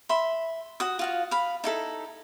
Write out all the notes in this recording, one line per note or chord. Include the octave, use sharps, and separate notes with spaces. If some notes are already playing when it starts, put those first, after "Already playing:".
E5 B5 C6
F#4 D#6
F4 F#4 F5
F5 B5
D#4 E4 A4